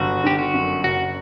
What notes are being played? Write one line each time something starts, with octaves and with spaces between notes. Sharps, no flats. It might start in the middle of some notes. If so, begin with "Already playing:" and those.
Already playing: G1 F#4
D3 G4
F#4
F#2
F#1 F#4